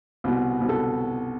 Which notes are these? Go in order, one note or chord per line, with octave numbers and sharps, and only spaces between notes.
C2 B2 B3
C2 B2 B3
A4